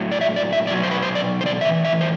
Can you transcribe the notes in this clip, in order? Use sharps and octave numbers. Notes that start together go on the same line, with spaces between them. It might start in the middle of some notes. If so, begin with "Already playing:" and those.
Already playing: A2 F#3
D5
E5
D5
E5
B2 F#3 D5
C5
B4
C5
D5
C5
D5
A2 E3 E5
E5
C5